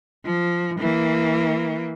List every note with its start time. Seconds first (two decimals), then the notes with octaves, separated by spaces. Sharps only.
0.25 F3
0.79 E3 A#3